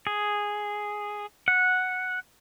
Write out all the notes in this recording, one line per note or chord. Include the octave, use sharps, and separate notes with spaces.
G#4
F#5